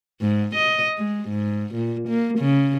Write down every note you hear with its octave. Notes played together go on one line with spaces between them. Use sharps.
G#2
D#5
G#3
G#2
A#2
A#3
C#3